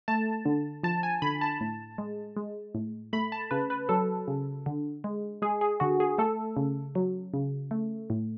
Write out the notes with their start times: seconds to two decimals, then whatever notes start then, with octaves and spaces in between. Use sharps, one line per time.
0.08 A3 A5
0.45 D3
0.83 F3 A5
1.03 G#5
1.22 D3 B5
1.41 A5
1.61 A2
1.98 G#3
2.37 G#3
2.75 A2
3.13 A3 B5
3.32 A5
3.51 C#3 B4
3.70 B4
3.89 F#3 A4
4.28 C#3
4.66 D3
5.04 G#3
5.42 G#3 G#4
5.61 G#4
5.80 D3 F#4
6.00 G#4
6.18 A3 A4
6.57 C#3
6.95 F#3
7.34 C#3
7.71 A3
8.10 A2